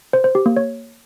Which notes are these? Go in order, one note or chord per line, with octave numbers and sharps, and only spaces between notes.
C5
C5
G4
A#3
C#5